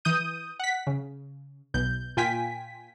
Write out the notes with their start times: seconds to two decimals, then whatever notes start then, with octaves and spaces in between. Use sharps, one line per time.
0.05 E3 D#6 G6 D#7
0.59 F#5 B6
0.87 C#3
1.74 B1 B2 G6
2.17 A#2 F4 G5 G#5 B6